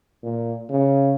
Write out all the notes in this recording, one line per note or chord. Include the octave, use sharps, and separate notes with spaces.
A#2
C#3